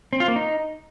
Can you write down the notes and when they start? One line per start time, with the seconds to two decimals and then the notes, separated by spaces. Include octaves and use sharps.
0.13 C4
0.20 F4
0.28 A#3
0.36 D#4